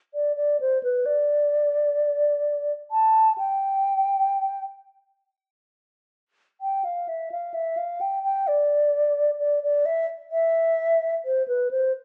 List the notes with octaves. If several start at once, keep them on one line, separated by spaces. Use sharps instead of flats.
D5
D5
C5
B4
D5
A5
G5
G5
F5
E5
F5
E5
F5
G5
G5
D5
D5
D5
E5
E5
C5
B4
C5